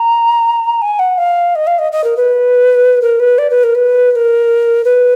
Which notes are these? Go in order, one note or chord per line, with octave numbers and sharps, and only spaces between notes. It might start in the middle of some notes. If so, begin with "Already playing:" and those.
Already playing: A#5
G#5
F#5
F5
D#5
F5
D#5
D#5
A#4
B4
A#4
B4
D5
B4
A#4
B4
B4
A#4
B4